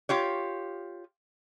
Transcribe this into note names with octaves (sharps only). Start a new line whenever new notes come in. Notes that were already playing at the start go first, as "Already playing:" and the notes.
F4 G4 C#5